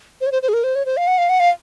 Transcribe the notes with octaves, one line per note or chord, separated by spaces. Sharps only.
C5
C#5
C5
C5
G#4
A#4
C5
C#5
C5
F5
F#5
F5
F#5
F5